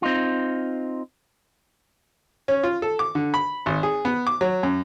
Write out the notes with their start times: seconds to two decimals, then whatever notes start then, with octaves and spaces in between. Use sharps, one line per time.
0.02 C4 D#4 F4
2.48 C#4
2.63 F4
2.82 A4
2.99 D6
3.15 D3
3.34 B5
3.66 G#1
3.83 G#4
4.05 B3
4.27 D6
4.41 F#3
4.63 F#2